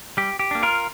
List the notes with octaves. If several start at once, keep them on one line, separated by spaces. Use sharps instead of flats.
G3 G4
G4
A#3 D4
F4 A#4